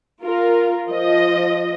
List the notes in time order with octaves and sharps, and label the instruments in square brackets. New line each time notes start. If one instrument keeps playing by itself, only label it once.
[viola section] F4 A#4
F3 D#5